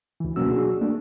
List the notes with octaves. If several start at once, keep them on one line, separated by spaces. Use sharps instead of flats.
D2 E3
B2 F#3 A#3 C#4 F#4 E6
D4 F#4 G#4
A3 A#3 D4